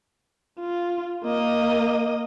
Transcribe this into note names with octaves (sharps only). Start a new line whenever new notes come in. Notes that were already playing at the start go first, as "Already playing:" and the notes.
F4
A#3 D#5